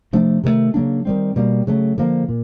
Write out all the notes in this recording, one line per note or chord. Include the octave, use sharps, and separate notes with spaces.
C3 F3 A3 D4
C3 D#3 F#3 A3
C#3 F#3 A#3 D4
D#3 G3 C4
B2 G3 A#3
C#3 F#3 A3
D3 F3 A#3
A#2